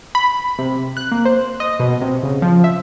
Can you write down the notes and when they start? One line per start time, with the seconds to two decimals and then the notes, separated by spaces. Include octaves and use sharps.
0.15 B5
0.59 C3
0.97 F#6
1.12 A#3
1.25 C5
1.60 D#5
1.80 B2
2.02 C3
2.23 C#3
2.42 F3
2.64 E5